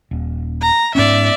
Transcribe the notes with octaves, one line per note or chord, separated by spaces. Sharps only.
D#1
A#5
G#2 B3 C#4 D5 E5